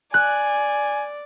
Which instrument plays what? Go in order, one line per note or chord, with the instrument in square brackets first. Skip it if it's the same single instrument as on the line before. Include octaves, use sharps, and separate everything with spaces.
[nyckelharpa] D5 [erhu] G#5 [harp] F#6